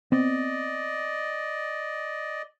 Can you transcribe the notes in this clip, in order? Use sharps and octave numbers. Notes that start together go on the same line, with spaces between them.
B3 C4 D5 D#5